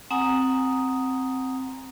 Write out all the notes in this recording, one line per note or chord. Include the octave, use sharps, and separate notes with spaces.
C4 F#5 G#5 A#5 D#6